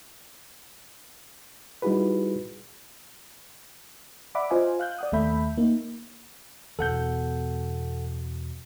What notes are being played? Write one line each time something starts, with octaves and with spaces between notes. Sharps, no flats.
G3 D#4 E4 F#4 G#4 B4
D5 E5 F#5 B5 D6
F4 C5 D#5 F5 G#5
F5 F#6 G6
D5 F#5 D#6
D#2 A3 A4 E5 B5 G6
A#3 D#4
E2 B2 A4 F#5 G6